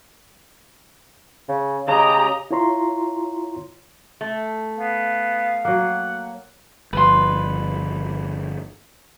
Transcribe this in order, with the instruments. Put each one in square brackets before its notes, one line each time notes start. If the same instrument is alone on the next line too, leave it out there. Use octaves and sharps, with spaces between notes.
[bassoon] C#3
[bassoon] C#3 [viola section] G4 D#5 A#5
[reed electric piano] E4 F4 C#5 A#5 C6
[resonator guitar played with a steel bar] A3
[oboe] B3 [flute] F5
[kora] F#3 A#3 [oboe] F#5
[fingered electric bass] G1 F3 [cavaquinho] B4 C6